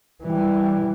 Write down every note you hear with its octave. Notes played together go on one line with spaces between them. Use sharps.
E3 G3